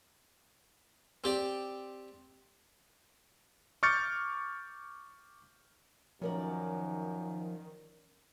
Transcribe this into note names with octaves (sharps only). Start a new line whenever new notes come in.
C4 G4 D5
C#6 D6 F6 G6 A6 C#7
F#2 D#3 F3 C#4 A#4 D5